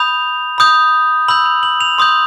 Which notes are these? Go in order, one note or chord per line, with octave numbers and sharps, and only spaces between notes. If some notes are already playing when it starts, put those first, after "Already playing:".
Already playing: B5 D#6 G6 F7
B5 D#6 G6
B5 E6 G6 F#7
F7
F#7
F7
C6 D#6 G6